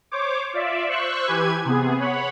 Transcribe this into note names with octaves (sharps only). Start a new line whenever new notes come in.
C5 C#5 D6
F4 D5 E5
C5 C#6 E6 F#6
E3 G4 B4 G#5 G#6
C3 B3 G#4
C#5 F#5 B5